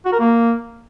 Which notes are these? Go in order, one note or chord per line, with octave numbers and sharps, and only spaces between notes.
F#4
A#4
A#3